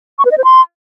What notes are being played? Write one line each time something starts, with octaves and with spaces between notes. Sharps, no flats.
C#6
B4
D#5
C5
C6